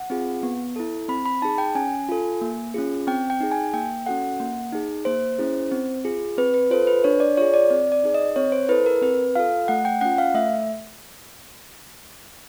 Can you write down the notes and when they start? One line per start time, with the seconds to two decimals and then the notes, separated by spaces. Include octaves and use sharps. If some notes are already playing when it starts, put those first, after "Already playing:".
Already playing: F#5
0.10 C4 F4 G#4
0.43 B3
0.76 E4 A4
1.09 C4 B5
1.25 B5
1.42 D#4 G#4 A5
1.58 G5
1.75 C#4 G#5
2.09 F4 A4
2.41 A#3
2.74 C#4 F4 G#4
3.07 C4 G5
3.30 G5
3.41 D#4 G#4
3.52 G#5
3.74 A#3 G5
4.06 C#4 F#4 A4 F#5
4.40 A#3
4.72 D#4 G#4
5.05 A#3 C5
5.38 C#4 E4 G#4
5.71 C4
6.05 F4 G#4
6.38 C4 B4
6.54 B4
6.70 F4 A4 C5
6.87 B4
7.04 D4 C#5
7.20 D5
7.37 F4 G#4 C#5
7.54 D5
7.70 C4 D5
7.92 D5
8.04 D#4 G#4
8.14 D#5
8.36 C4 C#5
8.52 C5
8.69 E4 A4 B4
8.86 A#4
9.02 C4 B4
9.35 F4 A4 F5
9.68 A3 F#5
9.85 G5
10.01 C#4 F4 F#5
10.18 F5
10.34 A3 E5